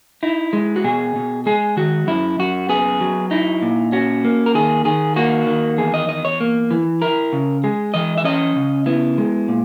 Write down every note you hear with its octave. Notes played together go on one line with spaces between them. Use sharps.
D#4 E4
G#3
F#4
B2 G#4
B2
G#3 G#4
D#3 F#4
F#2 E4
F#2 F#4
B3 G#4
F#3
D#4 E4
A#2
C#4 F#4
A#3
A#4
D#3 G#4
D#3 G#4
A#3 F#4
D#3
E2 G#4
D#5
E2 D#5
C#5
A#3
E3
E4 A#4
C#3
G#3 G#4
E3 D#5
E5
C#4 D#5
C#3
B3 E4
G#3
A#2